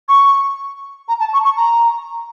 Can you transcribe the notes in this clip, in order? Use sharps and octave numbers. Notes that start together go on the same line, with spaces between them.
C#6
A#5
A5
C#6
C#6
A#5